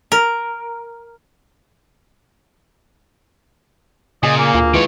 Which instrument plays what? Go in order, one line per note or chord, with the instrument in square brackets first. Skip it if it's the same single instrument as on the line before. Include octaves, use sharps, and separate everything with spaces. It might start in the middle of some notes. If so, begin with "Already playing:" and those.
[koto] A#4
[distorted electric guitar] A#2 [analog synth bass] C#3 [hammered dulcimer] G#4 [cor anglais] D#5
[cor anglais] A#3 [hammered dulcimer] D6
[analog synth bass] D2 [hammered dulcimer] F4
[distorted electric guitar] D#3 C#5 [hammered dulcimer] E3 G#3